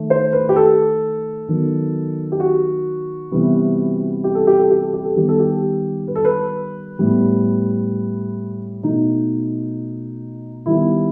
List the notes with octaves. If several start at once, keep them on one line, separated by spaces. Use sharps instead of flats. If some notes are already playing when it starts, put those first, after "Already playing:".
Already playing: D#3 A3
C5
B4
G4
A4
D#3 F#3 B3
G4
F#4
C3 E3 G3 B3
G4
A4
G4
A4
G4
A4
G4
A4
D#3 G3 B3 G4
A4
G4
B4
A4
B4
A2 G3 B3
B2 A3 D#4
D#3 G3 B3 E4